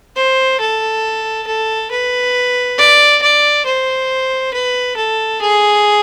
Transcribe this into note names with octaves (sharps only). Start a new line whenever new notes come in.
C5
A4
A4
B4
D5
D5
C5
B4
A4
G#4